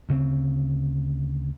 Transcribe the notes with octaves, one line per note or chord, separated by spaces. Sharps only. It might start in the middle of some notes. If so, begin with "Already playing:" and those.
D2 C#3 A#3 C4